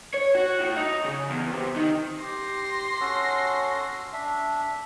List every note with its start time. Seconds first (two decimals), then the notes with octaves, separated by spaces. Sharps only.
0.14 C#5
0.35 F#4
0.60 A2
0.77 D#4
1.05 C#3
1.30 E2
1.52 C3
1.76 D#3
2.22 G4 C6 A#6
3.00 C#4 F#4 A4
4.13 D4 E5